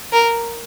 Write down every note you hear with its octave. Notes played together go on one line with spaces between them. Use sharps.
A#4